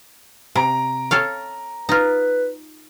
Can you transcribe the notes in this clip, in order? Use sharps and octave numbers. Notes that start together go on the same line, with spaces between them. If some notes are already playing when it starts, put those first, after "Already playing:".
C3 A#5 D7
A4 C#5 F5
D#4 F4 B4